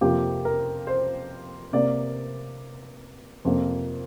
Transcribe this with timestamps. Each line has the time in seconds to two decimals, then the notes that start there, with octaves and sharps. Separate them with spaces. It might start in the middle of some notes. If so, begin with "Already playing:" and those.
0.01 F2 C3 F3 A#3 G4
0.45 A#4
0.87 C5
1.73 C3 A#3 D5
3.45 F2 C3 A#3